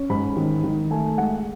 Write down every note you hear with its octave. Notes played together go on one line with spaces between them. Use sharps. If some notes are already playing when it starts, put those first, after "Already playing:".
Already playing: C#4
G#2 B5
D#3
D#3
A3 G#5
G#3 F#5